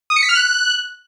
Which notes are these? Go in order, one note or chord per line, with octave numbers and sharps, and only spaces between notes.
D#6
C#7
B6
F6
F#6